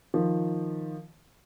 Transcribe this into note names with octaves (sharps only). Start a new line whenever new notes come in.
D#3 F3